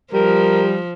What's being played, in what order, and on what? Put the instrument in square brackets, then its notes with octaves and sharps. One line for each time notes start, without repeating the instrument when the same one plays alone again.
[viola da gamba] F3 [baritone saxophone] G3 [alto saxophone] A#4